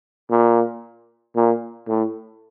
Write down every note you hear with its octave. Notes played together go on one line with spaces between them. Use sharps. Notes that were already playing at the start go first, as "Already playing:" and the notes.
A#2
A#2
A2